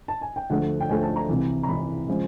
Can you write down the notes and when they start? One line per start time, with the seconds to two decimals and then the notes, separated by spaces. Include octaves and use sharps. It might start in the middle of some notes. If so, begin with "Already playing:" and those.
0.08 A5
0.22 G#5
0.36 G5
0.50 D2 D3 F3 A3 F#5
0.81 G5
0.89 D2 D3 F3 A3 G#5
1.03 A5
1.16 A#5
1.29 C2 C3 E3
1.63 A#5
1.68 C2 C3 E3 B5
2.08 C#3 F3 G#3